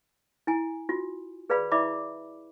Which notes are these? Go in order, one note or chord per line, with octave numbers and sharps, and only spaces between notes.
E4 G#5
F4 F#4
G#4 B4 D5 F5 B5
E4 D5 E5 B5 D6